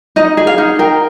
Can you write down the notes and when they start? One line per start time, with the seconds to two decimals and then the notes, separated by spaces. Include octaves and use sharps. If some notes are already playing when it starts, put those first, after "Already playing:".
0.16 D#4 D#5
0.37 G#4
0.47 F5
0.58 D#4
0.79 A#4 G5